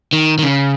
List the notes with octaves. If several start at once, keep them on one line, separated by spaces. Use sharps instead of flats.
D#3
D#3
C#3